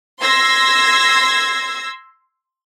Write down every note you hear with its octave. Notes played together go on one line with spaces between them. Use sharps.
C6 E6 G#6 A#6 C7